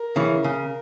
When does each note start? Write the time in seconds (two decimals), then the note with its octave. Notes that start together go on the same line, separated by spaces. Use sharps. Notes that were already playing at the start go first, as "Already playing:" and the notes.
Already playing: A#4
0.16 C#3 E3
0.44 C#3